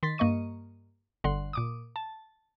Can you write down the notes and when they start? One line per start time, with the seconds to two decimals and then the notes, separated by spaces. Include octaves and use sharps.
0.03 D#3 C6 A6 B6
0.18 G2 A#3 D#5 C#6 D#7
1.24 G1 D3 F#5 C6
1.53 A#2 D6 D#6
1.96 A5